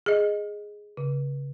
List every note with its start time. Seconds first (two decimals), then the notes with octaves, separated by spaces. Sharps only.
0.06 G#4 D#5
0.97 C#3